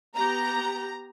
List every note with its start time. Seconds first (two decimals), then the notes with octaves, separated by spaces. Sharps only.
0.15 B3 G4 A#5